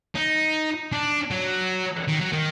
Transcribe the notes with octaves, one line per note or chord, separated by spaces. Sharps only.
D#4
D4
F#3
D#3
F#3
D#3